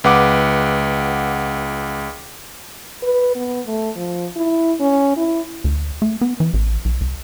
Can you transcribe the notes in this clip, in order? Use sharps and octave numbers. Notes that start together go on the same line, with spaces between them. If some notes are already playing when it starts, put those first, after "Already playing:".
C#2 B4 F#5 D6
B4
B3
A3
F3
E4
C#4
E4
D2
A3
B3
E3
A1
B1
C2